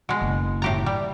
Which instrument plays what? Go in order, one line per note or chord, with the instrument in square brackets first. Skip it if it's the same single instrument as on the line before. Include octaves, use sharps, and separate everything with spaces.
[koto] B2 G#3
[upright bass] F#1
[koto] A2 G4 A#5
G3